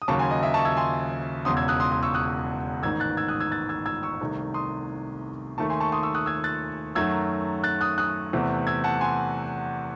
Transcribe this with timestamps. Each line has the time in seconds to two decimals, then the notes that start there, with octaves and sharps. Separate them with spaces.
0.02 D#6
0.08 D#2 C#3 F#3 A5 C#6
0.19 G#5 C6
0.31 D#5
0.43 E5
0.54 A5 C#6
0.65 E6 G#6
0.77 G#5 C6
1.45 E1 E2 C#3 C6 D#6
1.57 E6 G#6
1.68 D#6 F#6
1.80 C6 D#6
1.92 C6 D#6
2.03 C#6 E6
2.14 D#6 F#6
2.83 A1 G#2 D#3 E6 G#6
3.00 F#6 A6
3.17 E6 G#6
3.28 D#6 F#6
3.40 E6 G#6
3.51 F#6 A6
3.69 E6 G#6
3.86 E6 G#6
4.03 C#6 E6
4.21 C2 C3 D#3 A3
4.54 C6 D#6
5.58 D#2 D#3 A3 A5 C#6
5.70 G#5 C6
5.80 A5 C#6
5.92 C6 D#6
6.03 C#6 E6
6.15 D#6 F#6
6.26 E6 G#6
6.44 F#6 A6
6.95 F#2 D#3 F#3 A3 E6 G#6
7.64 F#6 A6
7.81 D#6 F#6
7.98 D#6 F#6
8.33 E2 C3 E3 A3
8.67 E6 G#6
8.84 F#5 A5
9.01 G#5 C6